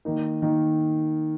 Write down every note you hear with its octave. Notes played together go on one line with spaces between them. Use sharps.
D#3 A#3 D#4
D#3 A#3 D#4